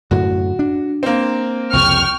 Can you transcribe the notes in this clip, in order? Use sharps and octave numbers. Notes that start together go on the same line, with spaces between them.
F#2 A2 D3 F#4
D4
A#3 C4
C2 F2 C#3 G5 C#6 F6